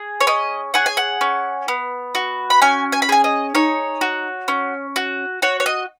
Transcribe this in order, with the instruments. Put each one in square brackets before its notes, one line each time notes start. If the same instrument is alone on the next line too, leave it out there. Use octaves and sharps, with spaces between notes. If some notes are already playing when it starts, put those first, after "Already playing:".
Already playing: [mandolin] G#4
C#5
C#4 D#5
G#4 F#5
G#5
F#5
C#4
B3
F#4
B5
C#4 G#5
G#5
B5
G#4 G#5
D#5
D#4 C#5
F#4
C#4
F#4
F#4 C#5
C#5
D#5